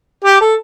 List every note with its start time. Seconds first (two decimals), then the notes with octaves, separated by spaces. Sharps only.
0.24 G4
0.40 A4